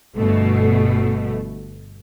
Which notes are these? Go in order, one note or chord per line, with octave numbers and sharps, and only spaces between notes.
G1 B2 A3